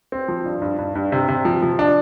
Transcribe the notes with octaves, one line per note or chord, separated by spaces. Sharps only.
C4
F3
G2
G2
G2
G2
C3
C3
F3
F3
D4